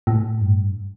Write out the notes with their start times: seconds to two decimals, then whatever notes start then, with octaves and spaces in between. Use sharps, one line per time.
0.07 A2
0.42 G2